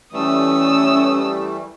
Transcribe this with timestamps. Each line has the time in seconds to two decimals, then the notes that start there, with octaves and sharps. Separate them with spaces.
0.13 E3 G3 A3 C#4 D#6 E6